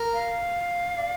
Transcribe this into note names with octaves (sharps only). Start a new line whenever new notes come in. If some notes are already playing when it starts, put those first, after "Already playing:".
Already playing: A#4
F5
D5